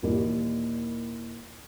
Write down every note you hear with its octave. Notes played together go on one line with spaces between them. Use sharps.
D#2 A#2 E3 G3